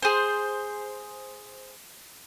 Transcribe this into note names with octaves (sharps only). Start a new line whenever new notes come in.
G#4 C5